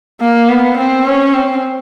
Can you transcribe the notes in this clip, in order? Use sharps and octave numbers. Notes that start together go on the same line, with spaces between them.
A#3
B3
C4
C#4
C4